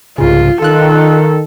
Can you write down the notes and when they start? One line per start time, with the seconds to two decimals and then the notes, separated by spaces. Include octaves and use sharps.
0.18 C2 G#2 C#3 F4
0.62 D#3 F4 A4 F#6